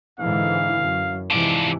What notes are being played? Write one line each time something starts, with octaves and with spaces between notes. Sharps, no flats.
G#2 D3 E3 F5
F#2
G#2 C3 E3 F3 D5